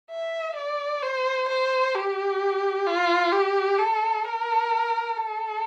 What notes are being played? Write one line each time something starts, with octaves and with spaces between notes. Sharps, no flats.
E5
D5
C5
C5
G4
F4
G4
A4
A#4
A4